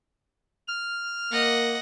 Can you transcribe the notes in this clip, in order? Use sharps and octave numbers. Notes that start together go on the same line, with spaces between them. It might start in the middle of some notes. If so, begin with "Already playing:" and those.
F6
A#3 D#5 F#5